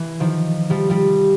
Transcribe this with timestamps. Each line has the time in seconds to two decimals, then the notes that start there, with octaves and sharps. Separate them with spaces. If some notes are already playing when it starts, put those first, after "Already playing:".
Already playing: E3
0.20 D#3 F3
0.70 F3 G3
0.90 F3 G3